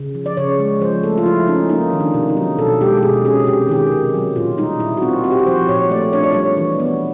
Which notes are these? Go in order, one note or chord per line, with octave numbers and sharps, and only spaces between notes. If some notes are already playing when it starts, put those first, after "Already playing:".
Already playing: C#3
F3
D5
C#3 C#5
G#3
F3 C5
A3 A4
F4
F3 E4
C#4 D#4
A#3 D#4
D#3
D4
C3
D#4
F#3
B2 A4
G#3 G4
G4
B2 G#4
C#4 G#4
C3 G4
D#3 G4
G#4
C3
F#3
A#2 F4
G3 D#4
A#2 E4
F#4
C4 F4
C4 F#4
G4
F#4
F3 C5
A#2 C#5
A3 D5
D4 C#5
D5
G3 C#5
E3
B3